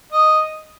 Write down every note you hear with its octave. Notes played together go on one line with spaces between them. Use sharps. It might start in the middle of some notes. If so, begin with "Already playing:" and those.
D#5